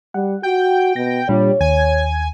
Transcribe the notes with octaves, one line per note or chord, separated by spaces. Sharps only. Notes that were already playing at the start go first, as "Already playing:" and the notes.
G3 F#5
F#4 G5
B2 A#6
A#2 G3 D4 F4 C#5
D#2 G#5